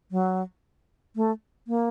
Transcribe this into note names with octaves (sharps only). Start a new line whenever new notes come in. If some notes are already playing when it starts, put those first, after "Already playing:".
F#3
A3
A#3